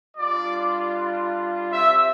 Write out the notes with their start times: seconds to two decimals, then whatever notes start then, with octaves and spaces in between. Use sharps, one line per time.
0.17 G3 D4 F4 D5
1.71 C4 G4 E5